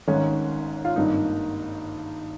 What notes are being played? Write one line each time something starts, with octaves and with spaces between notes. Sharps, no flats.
G#1 G#2 D#3 C#4
F4
G#1 G2 D#3 A#3 D#4